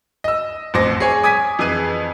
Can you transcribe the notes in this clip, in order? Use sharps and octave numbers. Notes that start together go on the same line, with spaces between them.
D#5 E6
A1 F2 C5 D6 A#6
G#4 C#5 G#5
G#5 D6 D#6 G#6 B6 D#7
F2 E3 G#4 D#7